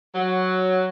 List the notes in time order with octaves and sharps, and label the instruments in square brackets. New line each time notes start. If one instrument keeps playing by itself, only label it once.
[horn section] F#3